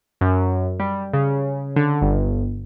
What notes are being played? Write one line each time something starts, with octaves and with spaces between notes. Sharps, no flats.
F#2
G3
C#3
D3
G1